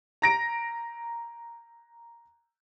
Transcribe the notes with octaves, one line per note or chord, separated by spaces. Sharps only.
A#5 A#6 D7